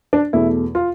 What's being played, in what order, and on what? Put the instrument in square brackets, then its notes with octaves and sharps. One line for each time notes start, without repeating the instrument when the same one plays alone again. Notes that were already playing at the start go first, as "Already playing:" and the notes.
[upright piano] D4
E2 B2 A3 E4
F4